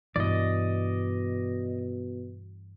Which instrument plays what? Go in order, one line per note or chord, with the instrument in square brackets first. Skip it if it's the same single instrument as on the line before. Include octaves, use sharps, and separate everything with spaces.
[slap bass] G2 E3 [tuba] B2 [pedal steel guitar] D5 D#5